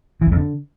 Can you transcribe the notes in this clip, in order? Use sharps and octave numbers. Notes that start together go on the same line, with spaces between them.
E3
E2
F2
D3